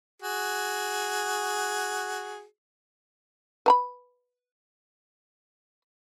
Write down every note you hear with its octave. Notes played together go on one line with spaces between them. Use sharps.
F#4 G#4
B4 A#5 B5